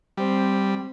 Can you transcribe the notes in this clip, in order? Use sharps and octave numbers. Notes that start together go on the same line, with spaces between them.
G3 C4